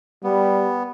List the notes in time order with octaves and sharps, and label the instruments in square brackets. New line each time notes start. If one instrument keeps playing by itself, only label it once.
[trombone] G3 [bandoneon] B3